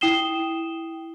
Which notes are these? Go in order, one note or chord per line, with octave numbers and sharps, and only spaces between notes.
E4 G5 D#6 C7 E7 G7